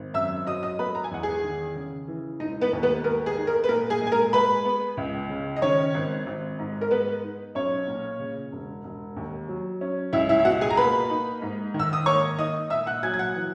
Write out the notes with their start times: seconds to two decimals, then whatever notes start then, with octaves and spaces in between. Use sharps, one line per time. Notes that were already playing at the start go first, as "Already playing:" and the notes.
Already playing: G#1
0.14 F#2 E5 E6
0.46 F#3 D#5 D#6
0.63 D#5 D#6
0.79 B3 B4 B5
0.95 A#5
1.04 G#5
1.11 E2 F#5
1.23 G#4 G#5
1.44 D#3
1.76 C#3
2.08 E3
2.40 E1 D#4 D#5
2.61 B3 B4
2.73 D#2
2.83 B3 B4
3.04 B3 A#4
3.26 G#4
3.37 D#4
3.47 A#4
3.64 B4
3.69 A#2 A#4
3.90 G#4 G#5
4.02 G#3
4.07 G#5
4.12 A#4 A#5
4.33 G#3 B4 B5
4.65 B3
4.97 C#2
5.30 C#3
5.56 D#5
5.62 D#3 C#4 C#5
5.95 G#1
6.26 G#1
6.59 G#2
6.81 A#4
6.91 G#3 B3 B4
7.23 D#4
7.55 B1 C#4 C#5
7.88 A#2
8.20 C#3
8.52 E1
8.84 E1
9.16 D#2
9.48 F#3
9.81 C#4
10.13 C#2 E4 E5
10.29 E4 E5
10.39 E5
10.45 B2 F#4 F#5
10.61 G#4 G#5
10.70 A#5
10.77 A#3 B4 B5
11.10 D#4
11.42 G#2
11.74 D#3
11.79 E6
11.93 D#6
12.06 A#3 C#5 C#6
12.39 D#4 D#5 D#6
12.70 A#2 E5 E6
12.87 F#5 F#6
13.03 F#3 G#5 G#6
13.14 G#6
13.19 F#5 F#6
13.35 E3